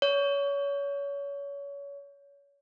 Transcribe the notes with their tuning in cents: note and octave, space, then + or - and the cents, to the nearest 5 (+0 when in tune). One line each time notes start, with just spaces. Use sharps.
C#5 +30